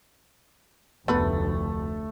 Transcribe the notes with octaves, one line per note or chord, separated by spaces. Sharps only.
F1 D2 A3 B3 B4